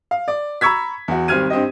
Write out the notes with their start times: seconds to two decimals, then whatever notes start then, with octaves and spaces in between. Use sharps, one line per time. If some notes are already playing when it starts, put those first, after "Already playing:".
0.11 F5
0.28 D5
0.61 A#5 B5 C#6 E6 G#6 B6
1.08 E2 F#4
1.28 G#1 G3 C4 F6 G#6 D#7
1.50 G2 C4 G4 D#5